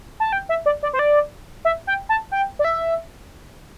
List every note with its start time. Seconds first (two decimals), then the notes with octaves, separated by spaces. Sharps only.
0.20 A5
0.33 G5
0.49 E5
0.66 D5
0.83 D5
0.93 C5
0.99 D5
1.65 E5
1.87 G5
2.09 A5
2.32 G5
2.59 D5
2.64 E5